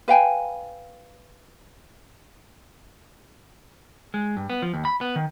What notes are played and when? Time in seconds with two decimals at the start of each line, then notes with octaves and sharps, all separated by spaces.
0.08 B4 F5 G5 G#5
4.14 G#3
4.37 G2
4.50 B3
4.62 F3
4.74 D#2
4.85 B5
5.01 B3
5.16 D#3